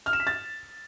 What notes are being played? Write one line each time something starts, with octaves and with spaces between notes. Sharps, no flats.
F6
E7
B6
A6